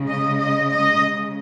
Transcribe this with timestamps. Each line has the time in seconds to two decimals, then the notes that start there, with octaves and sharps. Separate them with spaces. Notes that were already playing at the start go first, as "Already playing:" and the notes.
Already playing: C#3 G#3
0.08 D#5
0.39 D#5
0.70 D#5